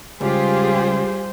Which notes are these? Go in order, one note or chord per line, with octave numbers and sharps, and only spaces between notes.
C#2 G3 F4 G4 G#4 C5